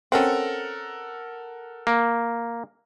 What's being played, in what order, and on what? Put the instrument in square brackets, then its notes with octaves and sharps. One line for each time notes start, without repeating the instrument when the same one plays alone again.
[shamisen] C4 C#4 [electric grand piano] A4 A#4 F#5
[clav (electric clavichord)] A#3